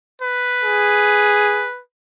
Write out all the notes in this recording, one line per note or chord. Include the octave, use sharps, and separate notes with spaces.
B4
G#4